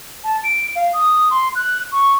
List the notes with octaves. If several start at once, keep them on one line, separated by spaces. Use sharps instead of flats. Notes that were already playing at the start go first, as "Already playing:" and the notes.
A5
D7
F5
D#6
C6
F#6
C#6